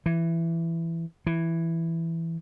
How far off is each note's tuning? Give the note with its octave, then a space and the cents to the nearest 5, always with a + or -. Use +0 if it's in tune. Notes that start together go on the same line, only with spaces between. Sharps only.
E3 +10
E3 +5